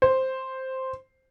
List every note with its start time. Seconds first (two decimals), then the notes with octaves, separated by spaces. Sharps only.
0.02 C5